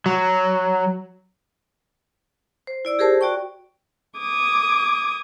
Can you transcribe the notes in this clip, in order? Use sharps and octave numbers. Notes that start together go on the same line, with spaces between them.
F#3
C5
E4 D5 E6
G4 G#4 A#4 C5 A5
F#4 D5 G5 C#6
D6 D#6 G#6